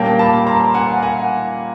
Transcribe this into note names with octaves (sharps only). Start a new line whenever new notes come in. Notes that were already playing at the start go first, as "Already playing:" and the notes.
Already playing: A#2 G3 A#3 C#4 G5 A5
A5 B5
A#5 C6
F#5 G#5
F#5 G#5